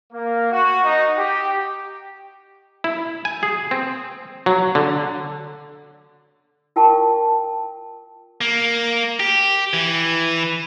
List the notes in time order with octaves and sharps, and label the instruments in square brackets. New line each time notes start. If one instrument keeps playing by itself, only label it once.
[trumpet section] A#3
F#4
D#4
G4
[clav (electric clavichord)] E4
G#5
G#4
C4
F#3
D3
[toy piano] F4 A#4 G5 A5 C#6
[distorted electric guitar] A#3
G4
E3